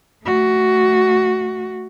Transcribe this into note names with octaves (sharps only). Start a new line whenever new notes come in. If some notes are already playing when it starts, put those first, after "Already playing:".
A3 F#4